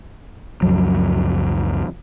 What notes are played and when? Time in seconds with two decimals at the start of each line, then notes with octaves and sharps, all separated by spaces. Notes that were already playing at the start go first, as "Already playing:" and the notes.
0.62 C#2 F#2 F3 F#3